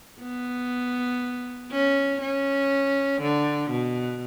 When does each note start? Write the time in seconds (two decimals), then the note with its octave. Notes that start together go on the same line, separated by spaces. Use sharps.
0.21 B3
1.71 C#4
2.21 C#4
3.21 D3
3.70 B2